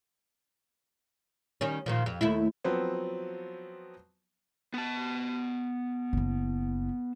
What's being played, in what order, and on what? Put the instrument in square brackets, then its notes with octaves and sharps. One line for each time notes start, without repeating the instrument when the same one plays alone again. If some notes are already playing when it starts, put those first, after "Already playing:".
[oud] D#3 G3 C#4
A#2 D#3 F3
F2
D#2 A3 E4
[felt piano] F3 F#3 B3 C4
[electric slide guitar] B3 A5
[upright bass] F#1 E4